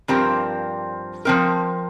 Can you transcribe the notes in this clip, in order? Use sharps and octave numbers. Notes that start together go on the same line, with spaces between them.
G2 F3 C4 G4 A#4
F3 C4 A#4